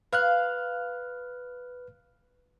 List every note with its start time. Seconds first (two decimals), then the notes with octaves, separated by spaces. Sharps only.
0.13 B4 F5 F6 F#6